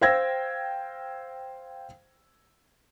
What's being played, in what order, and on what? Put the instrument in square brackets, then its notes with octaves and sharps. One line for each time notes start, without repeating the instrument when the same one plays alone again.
[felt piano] C5 F5 G5 E6 G#6 A#6